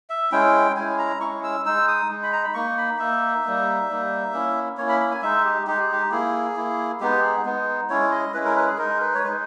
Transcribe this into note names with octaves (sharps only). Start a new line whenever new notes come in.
E5
G#3 C#4 E4 G5
G#3 C#4 E4 G#5
A#5
G#3 C#4 E4 C#6
E6
G#3 D#4 E6
D#6
G#3 D#4
B5
A#5
B5
A#3 D#4 C#6
B5
A#3 D#4 E5
G3 A#3 D#4
G3 A#3 D#4
A#3 C#4 E4
A#3 C#4 E4 C#5
B5
B5
G#5
G#3 D#4 E5
G4
G#3 D#4 G4
G#4
G4
A#3 E4 G#4
A#3 E4
G#3 B3 D#4 G4
G#4
G#3 B3 D#4
G#3 C#4 E4 C#5
D#5
G#3 C#4 E4 B4
A#4
B4
G#4
G#3 D#4 A#4
B4
C#5
G#3 D#4 B4